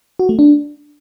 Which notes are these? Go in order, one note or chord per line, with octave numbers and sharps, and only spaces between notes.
F#4
A3
D4